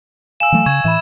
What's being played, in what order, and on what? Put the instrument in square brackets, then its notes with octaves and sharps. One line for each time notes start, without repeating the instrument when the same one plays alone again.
[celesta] F5 G#5 [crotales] E6 E7
[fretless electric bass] E3 F#3 A3
[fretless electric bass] C#3 [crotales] C#6 G#6
[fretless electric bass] A2 E3 [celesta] E5 B5